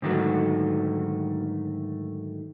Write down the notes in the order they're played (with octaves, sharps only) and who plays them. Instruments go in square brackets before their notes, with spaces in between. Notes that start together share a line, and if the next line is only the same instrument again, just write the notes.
[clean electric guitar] G#2 D3 D#3 F#3 A3